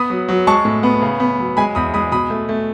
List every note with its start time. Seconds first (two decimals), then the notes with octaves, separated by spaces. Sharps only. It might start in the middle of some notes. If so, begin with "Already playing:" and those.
Already playing: B3 B5 D#6
0.10 F#3
0.29 F#3
0.47 G#3 A5 C#6
0.65 A2
0.83 B3
1.02 C#3
1.20 B3
1.38 F#3
1.57 G#3 G#5 B5
1.75 E2 B5 D#6
1.94 G#3 B5 D#6
2.12 B2 B5 D#6
2.30 A3
2.49 A3